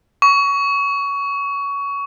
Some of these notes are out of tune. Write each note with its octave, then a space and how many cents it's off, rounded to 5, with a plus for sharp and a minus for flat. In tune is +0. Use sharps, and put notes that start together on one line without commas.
C#6 +20